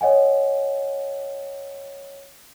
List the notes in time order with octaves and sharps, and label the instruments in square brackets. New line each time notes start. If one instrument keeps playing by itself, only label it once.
[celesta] C#5 D#5 F#5 G#5